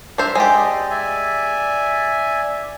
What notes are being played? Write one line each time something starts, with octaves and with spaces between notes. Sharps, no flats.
D4 C5 E5 A#5
G#3 G4 D5 D#5
D5 E5 G#5